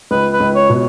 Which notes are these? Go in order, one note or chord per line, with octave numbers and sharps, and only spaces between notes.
C#2 B4
B4
C#2
C#5
B2